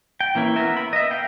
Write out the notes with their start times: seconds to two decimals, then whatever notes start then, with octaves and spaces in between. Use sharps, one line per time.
0.21 G5
0.35 E3 A#3 C#4 E4
0.56 B3 A#4 B4 E5
0.77 B5
0.93 D#5 E5
1.11 F5 G5